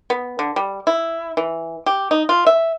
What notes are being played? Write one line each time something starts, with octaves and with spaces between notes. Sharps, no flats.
B3
D3
G3
E4
E3
G4
D#4
F4
E5